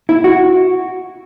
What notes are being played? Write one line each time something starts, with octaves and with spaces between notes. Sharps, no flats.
E4
F#4